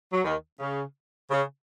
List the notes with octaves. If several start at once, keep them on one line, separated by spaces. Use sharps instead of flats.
F#3
D#2 D#3
C#3
C#3